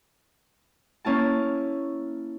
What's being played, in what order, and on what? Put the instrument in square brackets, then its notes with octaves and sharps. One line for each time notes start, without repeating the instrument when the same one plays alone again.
[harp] A#3 C#4 E4 A5